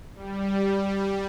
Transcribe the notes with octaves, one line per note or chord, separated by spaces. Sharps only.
G3